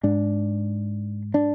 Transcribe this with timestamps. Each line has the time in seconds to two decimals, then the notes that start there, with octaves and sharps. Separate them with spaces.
0.03 G#2 D4
1.34 D4